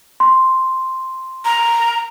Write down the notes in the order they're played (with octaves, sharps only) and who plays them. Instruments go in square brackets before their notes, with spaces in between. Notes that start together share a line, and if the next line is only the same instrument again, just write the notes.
[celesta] C6
[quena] A#5